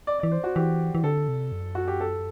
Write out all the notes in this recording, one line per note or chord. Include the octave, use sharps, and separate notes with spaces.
D5
E3 D5
C5
F#4
E3 G4
E3
D3 A4
C3
F#2
F#4
G4
A4